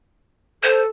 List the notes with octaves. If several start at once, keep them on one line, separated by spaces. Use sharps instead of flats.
A4 C5